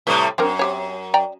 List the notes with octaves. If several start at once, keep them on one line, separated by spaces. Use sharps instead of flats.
A2 C3 G3 B4
F#2 C4 D4 A#4
C4 G4 C#5
D5 G5 A#5